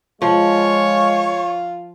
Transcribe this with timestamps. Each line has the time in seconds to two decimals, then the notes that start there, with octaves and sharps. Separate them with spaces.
0.22 F3 G#3 F4 C#5